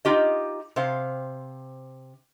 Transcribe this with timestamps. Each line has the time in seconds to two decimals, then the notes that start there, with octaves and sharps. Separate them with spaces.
0.05 D#4 F4 G4 D#5
0.76 C3 C5 F5